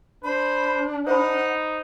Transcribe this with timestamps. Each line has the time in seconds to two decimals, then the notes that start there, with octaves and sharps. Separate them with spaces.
0.24 D4 C5 B5
1.07 D#4 C5 F#5 B5